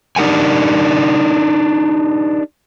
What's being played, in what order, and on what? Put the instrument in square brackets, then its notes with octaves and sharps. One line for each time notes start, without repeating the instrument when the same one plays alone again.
[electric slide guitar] D4 D#4 G4 A#4 F#5 G#5